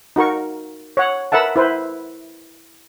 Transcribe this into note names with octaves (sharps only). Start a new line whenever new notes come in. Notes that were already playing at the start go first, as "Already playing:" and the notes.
D#4 F#4 A#4 C#6
C#5 F#5
A#4 B4 E5 F#5 A5
E4 B4 C5